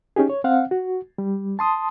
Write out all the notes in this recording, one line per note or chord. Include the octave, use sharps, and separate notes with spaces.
C#4 D#4 G4 G#4
C#5
C4 F5 F#5
F#4
G3
A5 C6 D#6